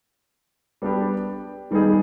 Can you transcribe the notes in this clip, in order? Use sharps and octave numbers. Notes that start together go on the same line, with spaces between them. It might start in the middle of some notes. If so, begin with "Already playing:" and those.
G3 B3 D4 G4
D#3 G3 B3 D#4 G#4